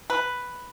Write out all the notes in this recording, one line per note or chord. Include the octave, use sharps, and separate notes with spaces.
B4